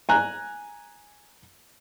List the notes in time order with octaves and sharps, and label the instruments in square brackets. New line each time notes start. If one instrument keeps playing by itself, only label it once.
[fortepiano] G#5 A#5 F#6